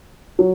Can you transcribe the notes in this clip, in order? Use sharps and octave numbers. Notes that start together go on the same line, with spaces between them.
F#3